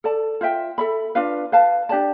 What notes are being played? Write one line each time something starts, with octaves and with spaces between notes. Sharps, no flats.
A4 D5 A5
F4 C5 E5 G5
A4 E5 B5
D4 F4 B4 F5
B4 F5 A5
D4 G4 D5 A5